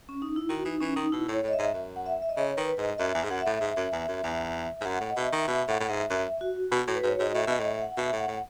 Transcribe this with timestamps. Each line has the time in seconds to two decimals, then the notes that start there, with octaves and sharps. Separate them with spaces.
0.09 C#4
0.22 D#4
0.36 E4
0.49 D#3 F#4
0.65 E3 D#4
0.81 E3 C#4
0.96 D#3 D#4
1.12 B2 E4
1.28 A2 C#5
1.43 A2
1.48 D#5
1.53 E5
1.59 G#2
1.74 F#2
1.96 F#5
2.06 E5
2.22 E5
2.29 D#5
2.36 C#3 C#5
2.57 D#3 B4
2.78 G#2 D#5
2.98 F#2 E5
3.15 E2
3.24 G#2
3.30 F#2 F#5
3.40 E5
3.46 A2
3.61 G#2
3.77 F#2
3.93 E2
4.08 F#2
4.24 E2
4.81 G#2
4.85 F#2 F#5
5.01 A2 F#5
5.10 D#5
5.17 B2 E5
5.33 D#3
5.48 B2 E5
5.68 A2 F#5
5.80 A2
5.89 G#2 E5
6.10 F#2 E5
6.41 F#4
6.72 B2
6.88 A2
6.95 B4
7.03 G#2 C#5
7.19 G#2 D#5
7.34 A2 E5
7.47 B2 D#5
7.59 A2
7.65 E5
7.82 F#5
7.97 B2 E5
8.13 A2 F#5
8.28 A2